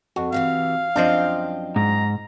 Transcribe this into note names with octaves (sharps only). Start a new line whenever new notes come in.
F2 F#4
C3 D#3 E3 F5
F#2 F3 C4 D4 D#5 G5
G#2 A#5